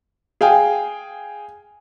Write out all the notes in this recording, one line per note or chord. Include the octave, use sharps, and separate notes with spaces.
G#4 F5 G5 G#5